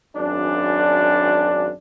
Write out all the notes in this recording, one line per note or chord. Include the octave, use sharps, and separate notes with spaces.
G#1 F#2 D4